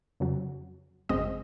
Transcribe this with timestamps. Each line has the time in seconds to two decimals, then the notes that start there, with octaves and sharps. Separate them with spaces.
0.20 F2 C#3 F#3
1.09 G#1 F#2 C#3 G#3 C4 D#5